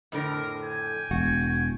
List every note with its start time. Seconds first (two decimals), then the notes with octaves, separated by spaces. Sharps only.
0.12 F2 A2 D3 A#4
0.64 G5 G#5
1.11 E1 F#4